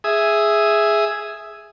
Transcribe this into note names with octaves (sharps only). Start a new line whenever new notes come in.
G#4 E5 D#6